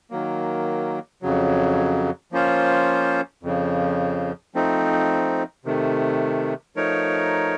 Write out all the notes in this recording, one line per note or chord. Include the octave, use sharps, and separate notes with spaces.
D#3 F#3 A#3
F2 C#3 F#3
F3 A#3 C#4 F4 C5
F2 C#3 F3
F3 A3 C4 D#4
C3 D#3 A3
F3 A3 D#4 A#4 C#5